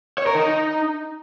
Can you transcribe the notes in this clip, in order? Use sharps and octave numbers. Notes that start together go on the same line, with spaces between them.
C#5
A#4
D#4